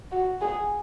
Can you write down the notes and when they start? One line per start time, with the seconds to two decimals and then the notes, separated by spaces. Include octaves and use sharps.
0.12 F#4
0.41 G#4